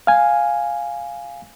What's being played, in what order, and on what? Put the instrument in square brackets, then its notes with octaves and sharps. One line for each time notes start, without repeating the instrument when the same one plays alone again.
[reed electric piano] F5 G#5